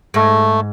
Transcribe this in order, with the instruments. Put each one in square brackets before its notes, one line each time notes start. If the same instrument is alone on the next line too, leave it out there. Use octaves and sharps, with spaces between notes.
[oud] G#2 [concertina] A3